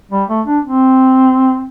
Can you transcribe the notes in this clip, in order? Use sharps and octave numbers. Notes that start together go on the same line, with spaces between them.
G3
A3
D4
C4